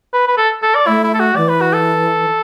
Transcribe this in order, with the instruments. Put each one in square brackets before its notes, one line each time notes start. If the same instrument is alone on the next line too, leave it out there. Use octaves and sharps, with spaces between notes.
[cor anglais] B4
B4
A4
A4
D5
[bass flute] A3 [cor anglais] E4
[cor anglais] E4
A4
F#4
[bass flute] E3 [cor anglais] D5
[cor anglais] B4
F#4
A4